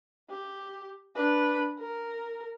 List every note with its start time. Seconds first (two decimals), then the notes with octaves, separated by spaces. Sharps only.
0.29 G4
1.15 D4 B4
1.79 A#4